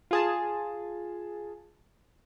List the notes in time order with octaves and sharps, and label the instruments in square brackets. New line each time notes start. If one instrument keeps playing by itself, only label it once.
[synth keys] F4 G#4 A5